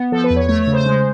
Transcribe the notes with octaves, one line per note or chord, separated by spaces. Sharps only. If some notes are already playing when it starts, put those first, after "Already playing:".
Already playing: B3
F3 A4
B4
E2
C#5
A3 C#5
C#5
C#3
C5
G#3